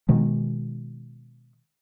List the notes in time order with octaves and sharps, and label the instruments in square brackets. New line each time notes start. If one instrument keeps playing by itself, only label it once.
[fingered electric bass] B2 D#3 G#3